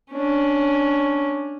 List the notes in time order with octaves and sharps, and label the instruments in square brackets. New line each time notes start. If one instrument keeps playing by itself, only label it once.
[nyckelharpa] C#4 D4